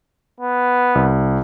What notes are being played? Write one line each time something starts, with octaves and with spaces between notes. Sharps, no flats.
B3
C2